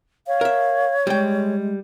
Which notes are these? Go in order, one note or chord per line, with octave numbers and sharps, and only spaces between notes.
C#5 F5
A#4 E5
G3 G#3 G5